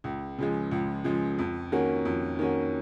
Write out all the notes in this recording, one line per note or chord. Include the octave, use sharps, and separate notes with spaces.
C#2
C#3 F3 G#3
C#2
C#3 F3 G#3
F2
D#3 A#3 C#4 F#4
F2
D#3 A#3 C#4 F#4